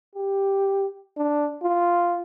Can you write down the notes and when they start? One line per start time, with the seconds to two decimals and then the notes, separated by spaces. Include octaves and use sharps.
0.15 G4
1.17 D4
1.62 F4